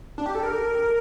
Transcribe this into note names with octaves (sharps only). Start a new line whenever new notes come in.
D4
G4
A4
A#4